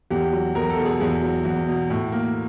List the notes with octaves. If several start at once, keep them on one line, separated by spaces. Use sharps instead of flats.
E2 G4
F#3
E2 A#4
A4
B2
G#4
E2 G#4
F#3
E2
B2
A2
A#3